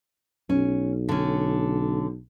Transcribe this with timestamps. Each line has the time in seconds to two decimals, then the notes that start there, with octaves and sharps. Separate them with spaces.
0.50 B1 C#4
1.09 D3 C#4